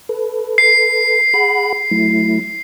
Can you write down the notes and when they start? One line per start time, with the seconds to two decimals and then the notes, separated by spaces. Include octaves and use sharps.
0.09 A4 B4
0.58 C7
1.34 G#4 F#5 B5
1.91 F#3 A3 E4